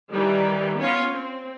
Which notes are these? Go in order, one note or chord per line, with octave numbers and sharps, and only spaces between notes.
D#3 E3 G3 D5
B3 C#4 F4 C#5
C4